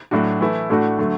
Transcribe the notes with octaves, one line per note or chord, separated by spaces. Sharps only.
A2 F#3 D4 F#4
E3 A3 E4
A2 A3 D4 F#4
D3 F#3 A3